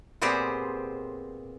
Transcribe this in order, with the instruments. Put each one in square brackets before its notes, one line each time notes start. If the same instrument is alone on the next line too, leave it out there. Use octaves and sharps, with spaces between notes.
[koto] A#2 B3 C4 G4 G#4 C5